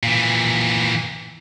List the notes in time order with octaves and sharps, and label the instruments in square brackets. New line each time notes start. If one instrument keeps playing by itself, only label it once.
[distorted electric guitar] A#2 E3